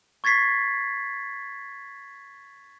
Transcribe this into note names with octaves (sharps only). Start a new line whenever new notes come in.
C#6 G#6 A6 B6 C7